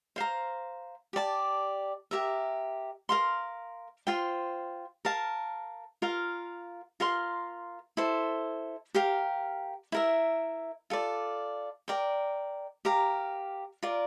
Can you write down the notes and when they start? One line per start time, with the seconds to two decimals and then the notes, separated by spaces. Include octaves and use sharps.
0.16 C5 F5 A#5
1.13 G4 D5 A5
2.11 G4 A#4 E5
3.09 A#4 F5 C6
4.07 F4 C5 G5
5.05 A#4 F5 A5
6.02 F4 A#4 F5
7.00 F4 A#4 F5 C6
7.97 E4 A4 C5
8.95 G4 A#4 F5
9.92 E4 A#4 E5
10.90 F4 A4 D5
11.88 A#4 D5 G5
12.85 G4 A#4 F5 A#5
13.83 F4 A#4 D5